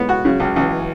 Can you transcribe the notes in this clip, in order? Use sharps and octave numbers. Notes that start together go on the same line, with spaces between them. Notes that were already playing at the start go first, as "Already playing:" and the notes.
Already playing: G#3 B3
F#4
C#3 F#3
C#2
C#2 E3